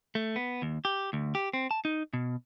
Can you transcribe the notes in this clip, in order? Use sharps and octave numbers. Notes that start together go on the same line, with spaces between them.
A3
B3
D#2
G4
D2
G4
C4
A5
D#4
B2